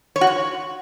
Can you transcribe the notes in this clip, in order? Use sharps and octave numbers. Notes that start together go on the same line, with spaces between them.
C#5
F#4
C#5